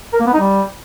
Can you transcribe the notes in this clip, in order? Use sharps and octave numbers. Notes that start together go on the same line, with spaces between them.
A#4
A#3
B3
D#4
G3